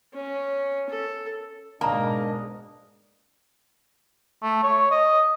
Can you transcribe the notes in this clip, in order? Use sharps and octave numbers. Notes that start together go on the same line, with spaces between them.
C#4
A4
G#2 B2 A#3 D4 D#5 A5 A#5
A3
C#5
D#5